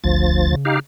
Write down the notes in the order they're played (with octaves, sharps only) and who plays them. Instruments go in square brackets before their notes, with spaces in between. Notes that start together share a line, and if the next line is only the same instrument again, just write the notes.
[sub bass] G#1 [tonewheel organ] D2 F3 A6
[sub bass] G1
C#3
[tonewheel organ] D#4 G4 F5